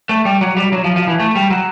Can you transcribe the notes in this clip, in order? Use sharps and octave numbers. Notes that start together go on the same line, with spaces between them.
A3
G3
F#3
G3
F#3
F3
F3
E3
A3
G3
F#3